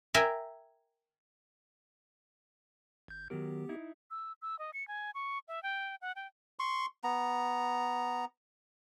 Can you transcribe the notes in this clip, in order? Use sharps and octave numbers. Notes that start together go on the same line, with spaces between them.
A#4 E5 G5 G#5
G#1 G6
D#3 F#3 B3 G4 A#4
D#4 E4
E6
E6
D#5
C#7
G#5
C#6
E5
G5
F#5
G5
C6 C#6
B3 A#5